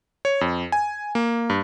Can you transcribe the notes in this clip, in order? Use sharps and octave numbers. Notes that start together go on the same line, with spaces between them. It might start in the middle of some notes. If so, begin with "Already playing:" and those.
C#5
F2
G#5
A#3
G2